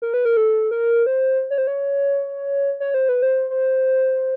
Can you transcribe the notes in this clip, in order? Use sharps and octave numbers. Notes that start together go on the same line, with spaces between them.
A#4
B4
A#4
A4
A#4
C5
C#5
C5
C#5
C#5
C5
B4
C5
C5